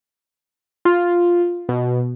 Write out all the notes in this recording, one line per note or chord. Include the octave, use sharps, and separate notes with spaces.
F4
B2